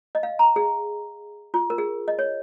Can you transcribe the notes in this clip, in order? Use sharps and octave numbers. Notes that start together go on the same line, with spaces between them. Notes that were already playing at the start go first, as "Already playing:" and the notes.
D#5
F5
A#5
G#4
F4
A#4
G#4
D#5
C#5